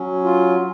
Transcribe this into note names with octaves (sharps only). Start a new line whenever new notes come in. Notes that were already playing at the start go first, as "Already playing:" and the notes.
Already playing: F#3 C#4
F4